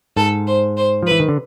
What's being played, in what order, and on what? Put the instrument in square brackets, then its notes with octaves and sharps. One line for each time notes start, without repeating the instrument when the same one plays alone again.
[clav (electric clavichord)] G#2 [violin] A4
[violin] C5
C5
[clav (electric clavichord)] F3
[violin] B4
[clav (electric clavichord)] E3
D#3
D3